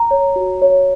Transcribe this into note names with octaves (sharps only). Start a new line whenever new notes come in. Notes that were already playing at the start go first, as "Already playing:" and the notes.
Already playing: A#5
C#5
F#4
C#5